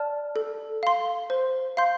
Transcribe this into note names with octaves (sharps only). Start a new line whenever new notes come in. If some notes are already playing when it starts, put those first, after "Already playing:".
Already playing: D5 A5 F6
A4
F5 C6
C5
F5 C6 G6